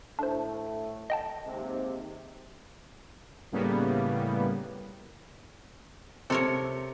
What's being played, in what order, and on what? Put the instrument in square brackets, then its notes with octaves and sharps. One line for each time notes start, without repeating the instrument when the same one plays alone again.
[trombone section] A2 A3 [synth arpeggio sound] D4 C5
[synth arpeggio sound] D#5 G5 A5
[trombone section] D#2 G#2 C3
[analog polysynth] A2 C#3 G3 A#3 B3
[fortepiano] C3 [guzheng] A4 A#4 C#5